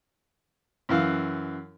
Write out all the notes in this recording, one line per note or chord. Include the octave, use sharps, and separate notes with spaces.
F#2 E3 F5